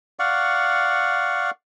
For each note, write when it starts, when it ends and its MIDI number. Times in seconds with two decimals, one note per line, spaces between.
0.19 1.50 74
0.19 1.50 77
0.19 1.50 78
0.19 1.50 85